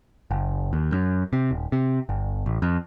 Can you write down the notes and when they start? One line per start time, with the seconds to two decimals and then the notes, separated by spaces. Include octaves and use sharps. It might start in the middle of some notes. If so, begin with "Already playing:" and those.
0.31 F#1
0.73 D#2
0.92 F#2
1.33 C3
1.51 D#1
1.72 C3
2.09 G1
2.46 A1
2.62 F2